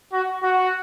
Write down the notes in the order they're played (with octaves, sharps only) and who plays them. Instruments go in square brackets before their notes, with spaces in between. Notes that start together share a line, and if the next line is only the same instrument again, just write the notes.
[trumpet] F#4
F#4